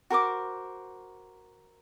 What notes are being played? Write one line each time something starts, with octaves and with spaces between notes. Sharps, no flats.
F#4 A#4 C5 D6